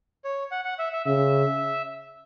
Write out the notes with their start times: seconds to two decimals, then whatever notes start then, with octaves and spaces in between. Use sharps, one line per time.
0.24 C#5
0.51 F#5
0.65 F#5
0.79 E5
0.93 E5
1.06 C#3 E5